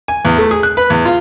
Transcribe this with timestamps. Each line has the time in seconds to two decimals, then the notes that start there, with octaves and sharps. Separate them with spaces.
0.08 G#5
0.25 E2
0.38 A3
0.51 G#4
0.63 F#6
0.77 B4
0.90 E2
1.05 F4